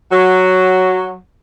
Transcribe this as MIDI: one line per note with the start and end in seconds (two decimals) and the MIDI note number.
0.12 1.16 54